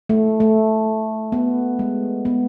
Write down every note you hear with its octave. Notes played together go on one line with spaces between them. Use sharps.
A3
A3
B3
G#3
B3